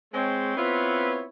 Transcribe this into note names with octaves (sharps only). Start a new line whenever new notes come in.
G#3 C4 C#5
B3 C4 E4 F4 B4 C#5